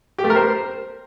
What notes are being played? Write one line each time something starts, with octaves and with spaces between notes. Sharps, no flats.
G4
A3
A#4
C5